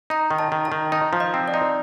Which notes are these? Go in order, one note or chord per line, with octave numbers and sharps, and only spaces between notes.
D#4 A#5
D#3
A5
D#3
A5
D#3
D#4 A5
F3
D#5
C4
D5
D#4